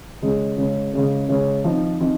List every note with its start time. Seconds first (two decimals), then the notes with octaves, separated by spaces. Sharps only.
0.22 C#3 G#3 C#4
0.58 C#3 G#3 C#4
0.93 C#3 G#3 C#4
1.29 C#3 G#3 C#4
1.64 F3 C4 D#4
2.01 F3 C4 D#4